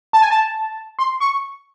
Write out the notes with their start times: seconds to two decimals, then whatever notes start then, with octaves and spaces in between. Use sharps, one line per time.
0.13 A5
0.21 G#5
0.30 A5
0.99 C6
1.20 C#6